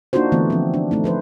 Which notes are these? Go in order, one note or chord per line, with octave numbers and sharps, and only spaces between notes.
A#3 D4 D#4 F4 F#4 C5
D3 E3 A3 B3 C4
F3 C4
D4
A3 C4 D#4
F3 B4 C5